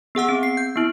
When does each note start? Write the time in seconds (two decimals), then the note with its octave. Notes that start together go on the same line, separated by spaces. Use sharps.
0.15 B3 G#4 F#5 E6
0.29 C4
0.43 C7
0.57 G6
0.76 B3 E4